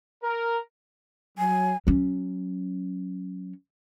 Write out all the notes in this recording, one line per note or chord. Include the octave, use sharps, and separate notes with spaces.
A#4
F#3 G#5
F#3 C#4